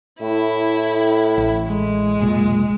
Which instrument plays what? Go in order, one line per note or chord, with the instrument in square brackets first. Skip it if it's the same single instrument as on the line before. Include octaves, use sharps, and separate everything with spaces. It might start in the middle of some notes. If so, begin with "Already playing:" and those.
[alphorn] A2 [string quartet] E4
[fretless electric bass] A1
[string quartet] G#3
[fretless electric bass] F1 B1 A#2